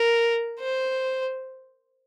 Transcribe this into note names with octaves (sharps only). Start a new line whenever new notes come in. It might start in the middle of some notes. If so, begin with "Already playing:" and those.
Already playing: A#4
C5